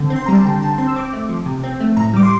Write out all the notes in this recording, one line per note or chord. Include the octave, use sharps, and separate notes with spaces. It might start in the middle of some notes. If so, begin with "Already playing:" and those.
Already playing: D3 C4
C4
C6
G3 A#5
A5
D3 G5
D3 A5
C4 C6
E6
C4 D6
A3
F3
C3
C4
A3
A2 A#5
G3 D6
C6